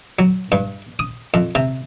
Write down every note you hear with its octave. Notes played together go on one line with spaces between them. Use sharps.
F#3
G2
D#6
F2
C3